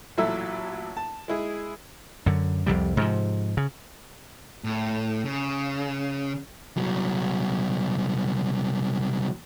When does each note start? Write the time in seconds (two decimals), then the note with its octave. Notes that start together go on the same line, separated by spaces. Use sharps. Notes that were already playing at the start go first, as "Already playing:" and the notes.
0.18 A1 A#2 F#3 E4 A4 E5
0.97 A5
1.28 G#3 E4 G#4
2.26 F#2 D3
2.66 C2 F2 C3 G3
2.97 G#2 C3 E3 F3
3.57 C#3
4.64 A2
5.25 C#3
6.77 C2 F#3